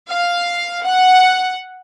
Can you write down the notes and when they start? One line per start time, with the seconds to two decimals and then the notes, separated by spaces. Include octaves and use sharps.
0.11 F5
0.85 F#5